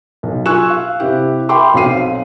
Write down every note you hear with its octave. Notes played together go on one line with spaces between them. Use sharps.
B1
F4 G#5 C#6 E6 F#6 E7
F5
C3 E4 G4
E5 G5 B5 C6 D6
B1 F#3 C4 F5 C7 D#7